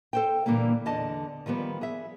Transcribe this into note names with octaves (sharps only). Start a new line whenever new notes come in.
A4 C5 G5
A#2 D3 E3 G3 A#3
E2 D3 D5 D#5 A5
D#3 F3 G3 B3
G#4 E5